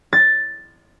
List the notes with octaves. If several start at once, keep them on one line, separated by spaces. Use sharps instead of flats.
A6